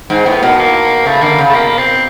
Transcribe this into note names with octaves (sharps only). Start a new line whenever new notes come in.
G#2 C4
A2 B3
B2 A#3
A#3
C#3 A3
D3 A#3
C#3
A3
B2 A#3
C4